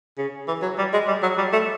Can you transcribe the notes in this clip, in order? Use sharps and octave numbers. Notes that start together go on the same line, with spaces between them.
C#3
E3
F#3
G3
G#3
G3
F#3
G3
A3